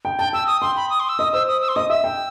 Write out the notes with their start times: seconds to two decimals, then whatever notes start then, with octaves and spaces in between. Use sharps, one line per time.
0.05 G5
0.19 G5 A5
0.33 G5 E6
0.47 D#6
0.62 G5 C6
0.76 B5
0.90 D#6
1.00 C6
1.09 E6
1.19 D#5 D#6
1.33 C5 E6
1.48 D#6
1.62 E6
1.68 C6
1.76 D#5 D#6
1.90 E5 E6
2.04 G5